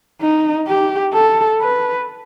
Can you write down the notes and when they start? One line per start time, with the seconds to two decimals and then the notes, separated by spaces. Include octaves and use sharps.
0.21 D#4
0.67 G4
1.14 A4
1.61 B4